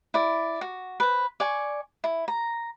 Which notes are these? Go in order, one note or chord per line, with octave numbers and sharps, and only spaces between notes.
E4 D5
F#4
B4 C5
D5 G#5 C#6
E4
A#5